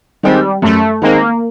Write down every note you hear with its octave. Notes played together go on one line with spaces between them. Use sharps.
D#3 G3 G#3 C4
F#2 A3
D#3 G#3 A#3 C4